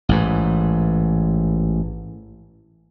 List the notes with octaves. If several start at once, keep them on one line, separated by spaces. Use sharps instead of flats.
A1 G#2 E3